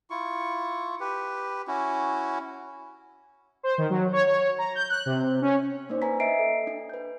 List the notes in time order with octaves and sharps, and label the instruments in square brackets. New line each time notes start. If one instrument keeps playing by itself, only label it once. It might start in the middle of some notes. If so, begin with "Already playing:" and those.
[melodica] E4 F4 C#6
G4 B4
C#4 E4 F#4
[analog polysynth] C5
D#3
F#3
C#5
C#5
A#5
G6
F#6
C3
C#4
[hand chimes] A#3 D4 D#4 C5 D5
B4 G#5 A#5 B6
D#5 E5 A#5 C7 D7
A4
D4
B4 G6